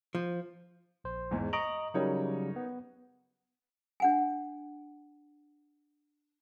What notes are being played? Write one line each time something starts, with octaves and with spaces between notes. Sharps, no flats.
F3
A#1 C5
E2 G#2
D#5 A#5 C#6 D7 F#7
C#3 F#3 G3 D#4 A#4 C#5
B3
D4 F#5 G#5